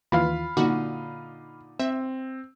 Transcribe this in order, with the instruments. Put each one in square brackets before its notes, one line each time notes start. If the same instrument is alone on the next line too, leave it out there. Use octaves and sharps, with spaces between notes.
[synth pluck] D#2 E3 [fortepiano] F4 [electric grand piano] F5 B5
[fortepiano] A#2 D3 D#4 [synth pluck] F#4
[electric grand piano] C4 [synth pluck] E5